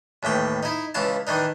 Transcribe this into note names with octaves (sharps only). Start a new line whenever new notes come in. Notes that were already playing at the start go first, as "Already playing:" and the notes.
D#2 A2 E3 G5
D#4 E4
C#2 E3 F5 A5
D#3 E3 D4 D#4